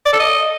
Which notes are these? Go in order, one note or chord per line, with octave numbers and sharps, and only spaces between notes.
D5
A4
D#5